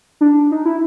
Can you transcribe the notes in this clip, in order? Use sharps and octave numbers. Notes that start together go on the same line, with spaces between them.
D4
D#4
E4